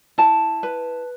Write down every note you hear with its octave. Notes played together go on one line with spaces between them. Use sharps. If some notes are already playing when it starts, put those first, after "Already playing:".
E4 A5
B4